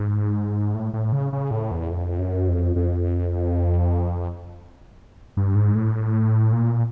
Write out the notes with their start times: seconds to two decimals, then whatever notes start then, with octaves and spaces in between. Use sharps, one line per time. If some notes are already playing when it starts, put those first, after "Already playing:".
Already playing: G#2
0.75 A2
0.94 A2
1.12 C#3
1.33 C#3
1.51 A2
1.71 E2
1.90 F2
2.19 F#2
2.48 F2
2.76 F2
5.37 G2
5.55 G#2
5.75 A2
6.52 A#2